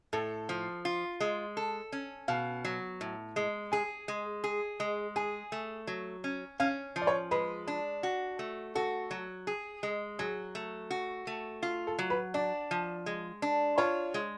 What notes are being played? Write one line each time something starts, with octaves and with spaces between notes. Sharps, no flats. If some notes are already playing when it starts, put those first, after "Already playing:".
A2 A4
F3
F4
G#3
A4
C#4
B2 F5
F#3
A2
G#3
G#4 G#5
G#3
G#4
G#3
G#4 G#5
A3
F#3
C#4
C#4 F5
F3
D5
C#5
G#3 B4
D4
F#4
A3
F#4 A4
F#3
G#4
G#3
F#3 G#4
A3
F#4
A3
F4
A4
F#3
B4
D4 D5
F3
G#3
D4
F4 C#5
G#3